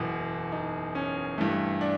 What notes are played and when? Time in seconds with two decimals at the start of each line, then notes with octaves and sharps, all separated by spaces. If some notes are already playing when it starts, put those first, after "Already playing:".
Already playing: F#1 E2 B2
0.52 D#4
0.95 C#4
1.38 G2 E3 A3
1.81 D4